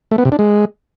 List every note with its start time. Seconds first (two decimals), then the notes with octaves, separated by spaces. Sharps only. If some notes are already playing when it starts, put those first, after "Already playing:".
0.11 A3
0.18 B3
0.25 C3
0.32 D4
0.39 G#3